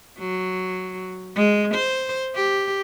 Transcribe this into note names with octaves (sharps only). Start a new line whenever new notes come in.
F#3
G#3
C5
G4